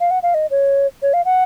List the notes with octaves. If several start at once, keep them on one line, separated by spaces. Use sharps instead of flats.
F5
F#5
F5
D#5
C#5
C#5
F5
F#5